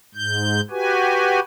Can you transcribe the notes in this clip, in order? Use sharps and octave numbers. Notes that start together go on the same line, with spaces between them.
G#2 G6
F#4 G4 B4 G#5